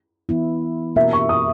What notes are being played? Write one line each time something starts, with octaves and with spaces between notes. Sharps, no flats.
E3 B3 E4
B2 A#3 C#4 F#4 A#4 E5
C#6
D#6